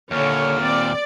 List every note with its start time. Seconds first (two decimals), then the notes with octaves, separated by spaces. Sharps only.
0.11 D#2 A#2 D3 C#5 F6
0.61 C4 D5